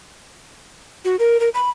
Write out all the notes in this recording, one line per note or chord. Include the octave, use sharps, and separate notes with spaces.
F#4
A#4
A#4
B5